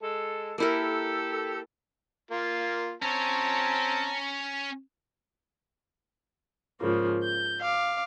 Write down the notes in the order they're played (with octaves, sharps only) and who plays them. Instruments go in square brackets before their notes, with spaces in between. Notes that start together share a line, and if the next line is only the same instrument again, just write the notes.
[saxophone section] G#3 A4
[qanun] A#3 E4 A#4 [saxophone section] G4 A4
[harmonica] A#3 F4
[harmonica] C4 A5 [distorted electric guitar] C#4 C#5 [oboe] A#5
[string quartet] G#2 C#3 F3 A#3
G6
F5 D6